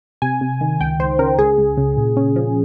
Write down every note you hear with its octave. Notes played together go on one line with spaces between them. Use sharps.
C3 G#5
C3
D#3
C#2 G5
C#2 C5
C#3 A#4
C#2 G#4
C#2
C#3
A#2
C#4
F3